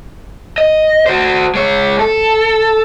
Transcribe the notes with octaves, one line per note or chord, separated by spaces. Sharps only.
D#5
F#4 C5
G#3 C#5
A4